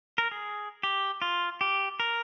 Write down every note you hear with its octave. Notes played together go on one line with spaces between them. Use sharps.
A#4
G#4
G4
F4
G4
A#4